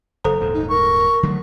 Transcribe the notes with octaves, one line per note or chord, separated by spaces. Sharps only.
F#1 A4 C5 A#5
D#1 G#2
D#4
A#4 C#6
D3 F#3 A3